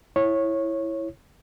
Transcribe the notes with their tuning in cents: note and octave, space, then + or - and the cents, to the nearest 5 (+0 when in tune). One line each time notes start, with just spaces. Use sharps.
E4 +0 C#5 -15